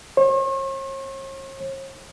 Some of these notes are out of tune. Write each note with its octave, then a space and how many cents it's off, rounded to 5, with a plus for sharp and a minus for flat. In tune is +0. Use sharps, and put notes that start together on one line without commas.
C#5 -45